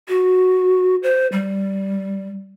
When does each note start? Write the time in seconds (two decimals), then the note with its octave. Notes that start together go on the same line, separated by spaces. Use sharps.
0.08 F#4
1.03 C5
1.32 G3